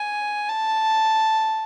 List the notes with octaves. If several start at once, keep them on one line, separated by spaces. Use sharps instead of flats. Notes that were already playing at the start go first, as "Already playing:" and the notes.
Already playing: G#5
A5